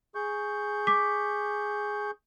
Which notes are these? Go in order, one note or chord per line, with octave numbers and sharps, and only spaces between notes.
G#4 C#6 G6
D6 B6